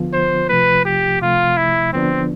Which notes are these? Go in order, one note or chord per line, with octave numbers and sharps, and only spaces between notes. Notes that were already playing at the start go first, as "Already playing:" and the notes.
Already playing: D3 F3 B3 F4
C5
C3 F3 A3 B4
G4
C3 F3 A3 F4
E4
D3 F3 B3 C4 D4